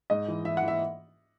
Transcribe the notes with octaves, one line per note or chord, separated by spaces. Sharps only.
G#2 D#5
E3
E3 E5
F#5
E3 E5